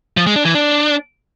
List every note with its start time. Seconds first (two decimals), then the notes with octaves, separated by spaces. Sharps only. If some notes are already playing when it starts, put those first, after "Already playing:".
0.17 F3
0.26 G#3
0.36 D4
0.45 E3
0.55 D4